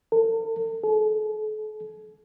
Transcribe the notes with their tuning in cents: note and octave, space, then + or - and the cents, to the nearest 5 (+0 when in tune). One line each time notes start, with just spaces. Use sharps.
A4 +40
A4 -45